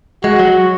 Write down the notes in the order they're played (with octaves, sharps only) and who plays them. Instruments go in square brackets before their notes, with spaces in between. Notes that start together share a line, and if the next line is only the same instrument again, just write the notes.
[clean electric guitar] G#3 [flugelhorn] F#4
[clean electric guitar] F#3